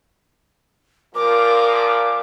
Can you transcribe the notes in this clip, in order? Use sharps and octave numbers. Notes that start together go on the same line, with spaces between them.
A#2 F3 A#4 D6